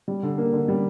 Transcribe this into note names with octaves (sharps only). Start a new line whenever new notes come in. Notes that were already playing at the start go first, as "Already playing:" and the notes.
G3
D3
A#3
D3
G3